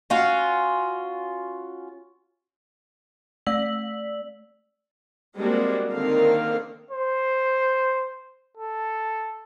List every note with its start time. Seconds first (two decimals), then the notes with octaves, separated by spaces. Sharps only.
0.10 C#4 F4 F#4
3.46 A3 D5 E6 B6 F#7
5.37 G3 G#3 A#3 C4 D4 F#4
5.93 D3 D#3 A#3 C4 A#4 F5
6.91 C5
8.58 A4